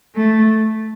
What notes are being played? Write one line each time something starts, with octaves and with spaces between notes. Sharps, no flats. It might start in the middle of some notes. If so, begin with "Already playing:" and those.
A3